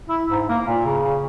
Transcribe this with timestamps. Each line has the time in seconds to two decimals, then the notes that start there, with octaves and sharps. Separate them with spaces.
0.09 E4
0.30 G#2
0.49 A#3
0.67 A#2
0.85 C#3